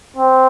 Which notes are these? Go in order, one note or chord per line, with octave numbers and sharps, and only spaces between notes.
C4